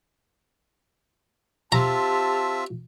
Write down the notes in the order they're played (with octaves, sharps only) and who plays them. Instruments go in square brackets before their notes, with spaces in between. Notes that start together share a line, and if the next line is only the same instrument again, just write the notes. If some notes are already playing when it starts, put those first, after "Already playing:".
[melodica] C4 F4 E5 [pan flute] G4 [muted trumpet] A5 [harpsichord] A#5